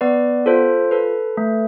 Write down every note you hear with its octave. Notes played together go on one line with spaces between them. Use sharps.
B3 B4 D5
F4 A4 C5
A4 B4
A3